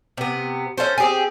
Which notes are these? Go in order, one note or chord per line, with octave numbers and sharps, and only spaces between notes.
C3 B3
C#4 E4 A4 C5
C4 G4 G#4